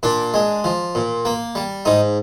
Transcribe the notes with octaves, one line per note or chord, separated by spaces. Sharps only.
A#2 D4
G#3
F3
A#2
A#3
G3
G#2 D#4